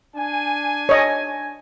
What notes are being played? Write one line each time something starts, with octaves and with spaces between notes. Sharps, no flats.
D4 G#5
C#5 D#5